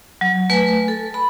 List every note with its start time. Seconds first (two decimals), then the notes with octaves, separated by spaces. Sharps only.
0.21 F#3
0.50 A3 B4 G#5
0.88 A4
1.14 B5